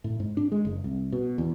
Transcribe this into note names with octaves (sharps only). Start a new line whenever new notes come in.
A2
G#2
D4
G#3
F#1
C2
B2
E2